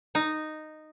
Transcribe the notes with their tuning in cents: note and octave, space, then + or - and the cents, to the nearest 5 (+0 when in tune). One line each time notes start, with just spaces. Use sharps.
D#4 -10